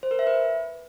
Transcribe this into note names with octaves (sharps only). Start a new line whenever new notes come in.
C5
A#4
E5
B4